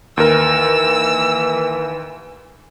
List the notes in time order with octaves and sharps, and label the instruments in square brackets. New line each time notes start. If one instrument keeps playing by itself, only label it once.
[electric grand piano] D#2 A#4 [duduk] E3 [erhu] E6